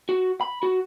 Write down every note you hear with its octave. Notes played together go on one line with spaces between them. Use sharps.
F#4
B5
F#4